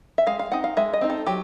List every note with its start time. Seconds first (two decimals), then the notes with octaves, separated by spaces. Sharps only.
0.18 E5
0.27 G#3 F5
0.39 F5
0.52 C4 D#4 F#5
0.64 F5
0.77 G#3 E5
0.93 D#5
1.01 C4 D#4
1.10 A4
1.26 F#3 G4